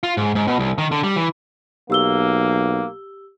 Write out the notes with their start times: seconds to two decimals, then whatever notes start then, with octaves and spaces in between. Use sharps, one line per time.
0.03 F4
0.17 G#2
0.35 G#2
0.47 B2
0.59 C2
0.78 D#3
0.91 D3
1.04 G3
1.16 E3
1.90 B1 A#3 G4 E6 G7